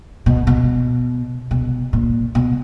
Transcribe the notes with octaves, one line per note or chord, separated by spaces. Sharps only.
B2
B2
B2
A#2
B2